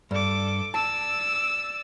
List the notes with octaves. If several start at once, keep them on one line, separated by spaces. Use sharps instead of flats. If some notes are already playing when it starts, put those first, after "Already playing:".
G2 A4 D6
D5 A5 E6